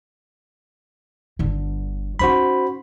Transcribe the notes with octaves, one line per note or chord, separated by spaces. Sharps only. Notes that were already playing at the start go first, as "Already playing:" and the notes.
G1 D3
C#4 D#4 F#4 C5 B5